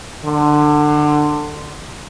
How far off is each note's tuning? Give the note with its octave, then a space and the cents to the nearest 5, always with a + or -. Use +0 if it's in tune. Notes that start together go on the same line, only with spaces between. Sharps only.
D3 +25